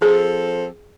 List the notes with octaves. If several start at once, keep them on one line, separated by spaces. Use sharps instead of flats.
F3 C4 G#4 A4